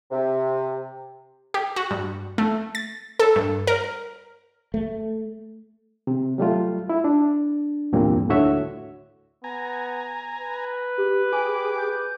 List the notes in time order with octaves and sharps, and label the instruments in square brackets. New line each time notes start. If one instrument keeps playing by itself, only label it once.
[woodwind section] C3
[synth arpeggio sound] G4
F#4
G2
A3
A6
A4
G2
A#4
[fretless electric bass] A3
[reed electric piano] C3
F#3 G3 A3 F4
E4
D4
E2 G2 A#2 G3 A#3 C4
D2 A2 D3 F#4 C#5 E5
[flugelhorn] B3 [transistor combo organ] G#5 A#5
[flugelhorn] B4
[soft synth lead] G4
[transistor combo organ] G4 G#4 D6 [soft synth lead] G#5
[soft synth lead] G6